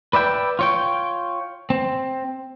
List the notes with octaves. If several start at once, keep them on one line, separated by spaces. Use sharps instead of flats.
B4 D5 E5 G5
F4 C#5 G5
C4